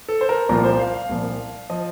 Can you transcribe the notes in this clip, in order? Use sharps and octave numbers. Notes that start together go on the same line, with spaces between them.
A4
C5
A#4
C2 A#2 F3 A#4
C5
F5
F5
C2 A#2 F3
F3 D#5